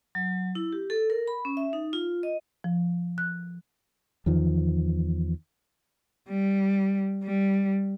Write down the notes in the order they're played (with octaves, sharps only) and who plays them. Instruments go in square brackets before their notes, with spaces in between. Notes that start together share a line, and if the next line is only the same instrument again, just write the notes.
[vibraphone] F#3
E4
G4
A4
A#4
B5
C#4
E5
D#4
F4
D#5
[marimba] F3
F#6
[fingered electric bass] E2 D#3 F3
[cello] G3
G3